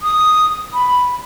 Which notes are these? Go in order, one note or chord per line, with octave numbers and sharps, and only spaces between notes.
D#6
B5